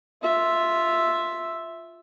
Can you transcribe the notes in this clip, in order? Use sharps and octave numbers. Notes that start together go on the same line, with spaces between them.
F4 E5